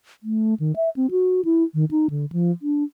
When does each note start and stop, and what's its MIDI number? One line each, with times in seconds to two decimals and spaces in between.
0.23 0.54 57
0.60 0.75 51
0.76 0.89 76
0.96 1.10 60
1.11 1.41 66
1.45 1.64 64
1.74 1.85 51
1.91 2.10 63
2.10 2.25 50
2.32 2.51 53
2.62 2.84 62